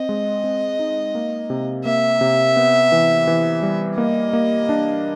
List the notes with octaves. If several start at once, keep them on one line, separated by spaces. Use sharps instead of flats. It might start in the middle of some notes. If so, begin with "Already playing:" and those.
Already playing: C4 D#5
G#3
C4
D#4
A#3
C3
A#3 E5
C3
B3
E3
E3
G3
A#3 D#5
A#3
D4